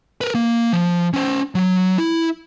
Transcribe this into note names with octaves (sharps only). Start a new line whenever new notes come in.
A#4 B4
A#3
F3
C#4 C5
F#3
E4